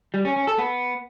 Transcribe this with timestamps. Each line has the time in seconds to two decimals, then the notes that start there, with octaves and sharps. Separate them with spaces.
0.14 G3
0.25 C#4
0.36 C#4
0.47 A4
0.59 B3